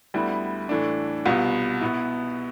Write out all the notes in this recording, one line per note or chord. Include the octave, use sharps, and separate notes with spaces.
D2 D3 G3 B3 E4
A2 E3 A3 D4
C2 B2 B3 F4
B2 B3 E4